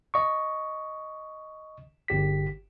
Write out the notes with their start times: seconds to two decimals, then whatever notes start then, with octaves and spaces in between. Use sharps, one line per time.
0.14 D#5 C#6
2.08 G1 G4 B6